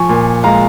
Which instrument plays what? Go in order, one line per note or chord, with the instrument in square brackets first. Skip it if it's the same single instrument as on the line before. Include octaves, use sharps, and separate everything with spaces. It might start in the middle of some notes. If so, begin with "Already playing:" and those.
Already playing: [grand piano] F3 G#5 C#6
A#2
G#3 F5 A#5